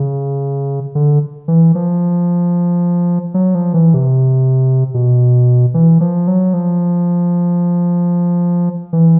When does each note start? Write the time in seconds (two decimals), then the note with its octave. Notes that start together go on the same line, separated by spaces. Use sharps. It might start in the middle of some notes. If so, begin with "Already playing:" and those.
Already playing: C#3
0.95 D3
1.48 E3
1.75 F3
3.34 F#3
3.55 F3
3.74 E3
3.94 C3
4.94 B2
5.74 E3
6.01 F3
6.28 F#3
6.54 F3
8.93 E3